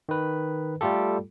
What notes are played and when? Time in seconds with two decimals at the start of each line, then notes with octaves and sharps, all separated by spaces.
0.09 D#3 B4
0.81 G3 A3 F4 G4 A4